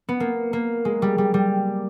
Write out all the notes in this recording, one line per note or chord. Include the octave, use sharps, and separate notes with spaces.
B3
A#3
A#3
G#3
G3
G3
G3